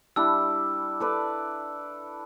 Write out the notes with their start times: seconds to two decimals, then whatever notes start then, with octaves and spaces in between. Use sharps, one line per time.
0.16 G3 D4 E4 E6
1.00 A4 B4 D5